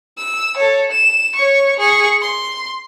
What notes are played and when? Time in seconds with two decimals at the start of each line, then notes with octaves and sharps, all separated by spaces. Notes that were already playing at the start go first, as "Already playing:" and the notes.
0.18 E6
0.57 A4 C#5
0.91 E7
1.35 C#5 C#6
1.79 G#4 C#6
2.21 C6